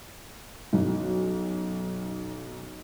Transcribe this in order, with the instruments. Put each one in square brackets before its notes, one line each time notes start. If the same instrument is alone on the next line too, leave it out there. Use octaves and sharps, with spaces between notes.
[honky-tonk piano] B1 F#2